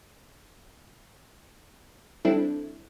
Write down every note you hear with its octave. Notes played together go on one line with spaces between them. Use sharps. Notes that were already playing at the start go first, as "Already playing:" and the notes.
G3 C4 D4 E4 A4